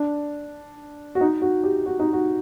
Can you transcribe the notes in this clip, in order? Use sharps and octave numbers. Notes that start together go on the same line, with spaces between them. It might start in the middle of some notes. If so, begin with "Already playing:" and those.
Already playing: D4
F#4
D#4
F#4
G4
F#4
D#4
F#4